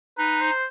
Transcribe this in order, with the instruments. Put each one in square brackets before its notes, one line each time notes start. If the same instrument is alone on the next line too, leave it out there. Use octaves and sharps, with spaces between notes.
[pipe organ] D#4 [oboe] B4
[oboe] C5